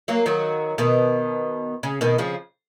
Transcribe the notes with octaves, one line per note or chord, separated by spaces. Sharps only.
F#3 A#3
D#3 F#3
B2 D#3
C#3
B2 D#3
C#3 F3